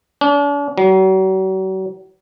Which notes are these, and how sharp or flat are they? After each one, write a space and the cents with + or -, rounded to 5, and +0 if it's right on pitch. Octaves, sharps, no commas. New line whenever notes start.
D4 -45
F#3 +40